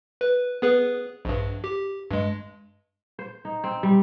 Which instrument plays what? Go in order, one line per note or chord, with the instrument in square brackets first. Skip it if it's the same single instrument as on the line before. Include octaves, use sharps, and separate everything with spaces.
[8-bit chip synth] B4
B3 G#4 B4
A#1 G2
G4
G2 G#3
[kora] C5
D#4
C4
G3